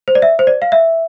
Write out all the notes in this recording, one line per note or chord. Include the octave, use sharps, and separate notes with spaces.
C5
D5
E5
C5
D5
F5
E5